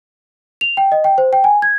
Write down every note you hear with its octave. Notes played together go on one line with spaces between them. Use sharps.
F7
G5
D#5
G5
C5
G5
G#5
G#6